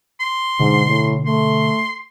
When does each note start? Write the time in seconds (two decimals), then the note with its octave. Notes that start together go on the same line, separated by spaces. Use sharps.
0.20 C6
0.60 G#2 B2 D3
0.88 A2
1.26 A3 C6